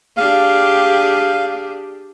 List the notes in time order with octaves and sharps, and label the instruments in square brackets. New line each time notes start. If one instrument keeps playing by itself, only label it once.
[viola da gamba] D4 G4 G#4 [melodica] F5